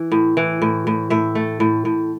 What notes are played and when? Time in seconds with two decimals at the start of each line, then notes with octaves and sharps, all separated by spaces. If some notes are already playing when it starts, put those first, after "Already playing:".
Already playing: E3
0.12 A2
0.37 E3
0.62 A2
0.87 A2
1.10 A2 E5
1.35 A3
1.60 A2
1.85 A2